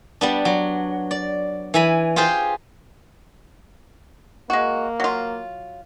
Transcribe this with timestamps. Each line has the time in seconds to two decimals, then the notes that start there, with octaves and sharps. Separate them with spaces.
0.21 G3 B3 D4
0.45 F#3
1.11 D5
1.74 E3 G#5 B5
2.16 F4 G4 G#4 C5
4.50 G#3 A#3 F#4
5.00 F#3 F4